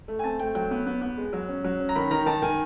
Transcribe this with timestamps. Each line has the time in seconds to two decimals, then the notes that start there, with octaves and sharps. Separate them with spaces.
0.08 A3
0.19 G#5
0.24 C4 A5
0.39 A3 G5
0.55 F#3 G5
0.71 B3
0.87 B3
1.02 B3
1.18 G#3
1.33 F#3
1.49 C#4
1.64 F#3
1.80 C#4
1.89 A#5
1.96 D#3 B5
2.11 D#3 A#5
2.26 D#3 A5
2.42 D#3 G#5